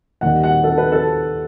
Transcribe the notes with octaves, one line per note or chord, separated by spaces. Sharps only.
D#2 D#3 G3 F#5
F#5
A4
B4
A4